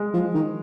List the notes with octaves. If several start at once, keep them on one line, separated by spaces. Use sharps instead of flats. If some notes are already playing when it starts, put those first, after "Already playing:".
Already playing: G#3
F3
D#3